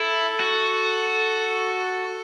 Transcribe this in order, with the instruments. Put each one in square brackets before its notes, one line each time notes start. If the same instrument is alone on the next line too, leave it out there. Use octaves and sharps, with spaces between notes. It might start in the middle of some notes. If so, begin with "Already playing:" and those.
Already playing: [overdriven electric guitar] E4 [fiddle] A4
[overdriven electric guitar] F#4